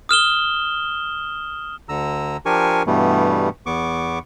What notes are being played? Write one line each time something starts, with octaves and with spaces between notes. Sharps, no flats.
D#6 F6 E7 G7
D2 D3 A#5 E6
F3 D4 G4 A#4 G#5 C#6
G2 B2 E3 G3 A3 B3
E2 B3 C#6 D6